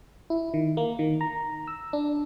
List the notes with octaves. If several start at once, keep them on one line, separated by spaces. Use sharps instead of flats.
E4
D#3
A#3
D#3
A#5
E6
D4